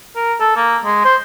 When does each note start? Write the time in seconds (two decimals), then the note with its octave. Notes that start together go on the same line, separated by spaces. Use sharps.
0.16 A#4
0.40 A4
0.56 A#3
0.84 G#3
1.04 C5